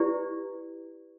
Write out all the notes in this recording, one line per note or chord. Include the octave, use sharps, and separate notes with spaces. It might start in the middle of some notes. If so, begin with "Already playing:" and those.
Already playing: E4 G4 B4 D5